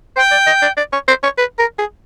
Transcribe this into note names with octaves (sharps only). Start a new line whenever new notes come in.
C5 G5
D5
D#5
D5
D5
C#5
C5
C#5
B4
A#4
G#4